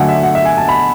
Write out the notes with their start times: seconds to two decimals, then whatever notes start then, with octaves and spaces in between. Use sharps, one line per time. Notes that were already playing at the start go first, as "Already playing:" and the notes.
Already playing: D3 F#3 A3 F#5 G#5
0.09 E5
0.23 F#5
0.35 E5
0.45 G#5
0.58 A5
0.69 B5